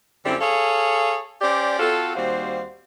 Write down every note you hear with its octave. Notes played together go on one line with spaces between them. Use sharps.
F#2 D3 G3 C4 E4 C5
G#4 A4 C#5 F5
C#4 G4 C5 D5
C4 F4 F#4 A4
D#2 G3 C4 F#4 C5 F5